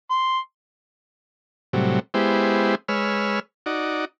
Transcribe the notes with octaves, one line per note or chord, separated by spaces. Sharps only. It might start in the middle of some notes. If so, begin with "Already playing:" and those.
C6
A2 C3 F#3 G3
G#3 B3 E4 G4 C5
G#3 B4 C#5 E6 F6
D#4 F#4 D5